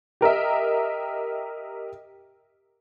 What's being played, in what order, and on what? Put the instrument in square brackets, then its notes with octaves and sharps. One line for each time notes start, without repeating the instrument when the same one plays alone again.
[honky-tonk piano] G4 A#4 D#5 E5